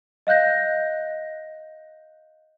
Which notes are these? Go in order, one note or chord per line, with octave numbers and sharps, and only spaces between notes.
D#5 F5 F#6 G6 A#6